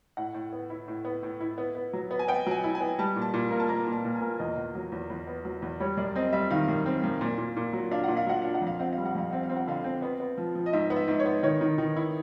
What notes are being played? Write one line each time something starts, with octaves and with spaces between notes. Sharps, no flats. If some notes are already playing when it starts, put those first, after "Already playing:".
A2 F#5
A2
B3
E4
A2
B3
A2
E4
B3
B3
F#3
B3
G#5
B3 G5
F#3 G#5
E4
G#5
B3
G3 A5
A#2
A5
A#2
A#3
A5
A#3 A#5
A#2
A5
A#2
G#5
A#3
E2 D#5
E2
F#3
E2
E2
B3
F#3
E2
G3 C#5
F#2 D5
C4 D#5
G3 E5
D#3 F5
F#2
C4
F#2
A#2
A#2
A#2
F#3
D4 F5
A#2 F#5
F5
F#3 F#5
D4 F5
F#5
F2
F5
C4 F#5
G3 F5
F#5
F2 F5
C4 F#5
F5
C4
F#5
D3 F5
C4
B3
B3
F3
F3
D#5
G#2 E5
B3
E5
G#2
C#5
B3
D#3 C#5
D#3
D#3
E4